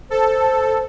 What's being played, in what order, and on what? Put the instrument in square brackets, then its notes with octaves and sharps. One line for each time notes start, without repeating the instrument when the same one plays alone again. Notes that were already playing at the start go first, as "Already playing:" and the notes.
[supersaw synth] A4 [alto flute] C5